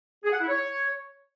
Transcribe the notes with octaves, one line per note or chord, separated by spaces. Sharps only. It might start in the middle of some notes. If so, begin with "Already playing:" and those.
G#4
F#5
E4
C#5